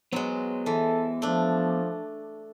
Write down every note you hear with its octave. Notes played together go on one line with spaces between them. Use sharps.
F#3 G#3 B3 B4 C5
E3 A4
F3 A3 D4